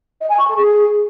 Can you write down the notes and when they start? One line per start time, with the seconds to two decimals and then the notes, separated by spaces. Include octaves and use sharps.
0.20 D#5
0.29 G#5
0.38 C#6
0.47 A4
0.56 G#4